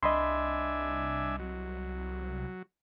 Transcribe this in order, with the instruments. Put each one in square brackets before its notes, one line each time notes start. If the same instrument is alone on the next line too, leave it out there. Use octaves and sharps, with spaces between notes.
[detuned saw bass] C2 [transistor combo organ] D4 E5 G#5 [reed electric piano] D#5 B5 C6
[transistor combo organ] F#3